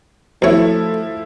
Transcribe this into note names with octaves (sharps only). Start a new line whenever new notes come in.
B1 F3 A3 E4 F#4 C#5 E5